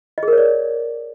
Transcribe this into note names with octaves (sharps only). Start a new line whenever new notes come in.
D#5
G#4
A#4
C#5
D5